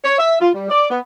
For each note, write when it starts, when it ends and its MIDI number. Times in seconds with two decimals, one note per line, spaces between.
0.04 0.18 73
0.19 0.36 76
0.41 0.49 65
0.53 0.68 55
0.70 0.88 74
0.90 0.99 59